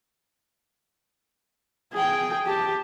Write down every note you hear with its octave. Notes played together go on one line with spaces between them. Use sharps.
G#4 G5
G4 A5